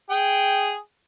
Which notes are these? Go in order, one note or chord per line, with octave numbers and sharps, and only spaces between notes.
G#4 G5